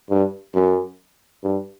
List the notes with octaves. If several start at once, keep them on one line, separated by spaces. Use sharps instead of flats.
G2
F#2
G2